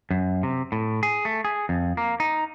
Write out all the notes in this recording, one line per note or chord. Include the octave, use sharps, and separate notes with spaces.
F#2
C3
A2
G#4
A3
G#4
F2
A#3
D#4